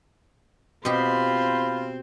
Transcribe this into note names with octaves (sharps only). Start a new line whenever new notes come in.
B2 C4 F4 G4 C5 B5